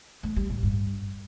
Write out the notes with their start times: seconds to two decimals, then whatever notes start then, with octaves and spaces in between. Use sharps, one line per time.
0.23 A3
0.36 G3
0.50 A2
0.63 G2